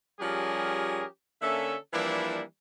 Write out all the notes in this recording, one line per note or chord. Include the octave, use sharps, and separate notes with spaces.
F3 G3 C#4 G4 G#4 A#4
D3 A#3 C#4 A4 E5
E3 F3 G3 A#3 D4 E4